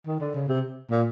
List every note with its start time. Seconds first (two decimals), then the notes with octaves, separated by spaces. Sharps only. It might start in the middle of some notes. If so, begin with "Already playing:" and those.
0.07 D#3
0.20 D3
0.35 C#3
0.48 C3
0.90 A#2